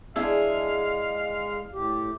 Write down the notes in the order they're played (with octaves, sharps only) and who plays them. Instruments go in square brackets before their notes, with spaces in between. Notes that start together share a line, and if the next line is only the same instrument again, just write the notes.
[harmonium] G#3 [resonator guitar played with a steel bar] D4 E4 G#4 [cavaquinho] E5 [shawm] F5
[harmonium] A2 G4